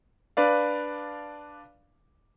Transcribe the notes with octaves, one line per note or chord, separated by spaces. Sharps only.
D4 B4 D5 F5